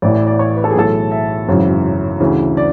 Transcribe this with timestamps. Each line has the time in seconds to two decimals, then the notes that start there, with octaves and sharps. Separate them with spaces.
0.02 A1 A2 E3 D5
0.15 D5
0.27 D5
0.39 C#5
0.56 B4
0.64 A4
0.71 G#4
0.75 B1 A2 E3 A4
1.11 E5
1.48 G#1 F#2 C#3 E3
2.20 D2 C#3 E3
2.57 D5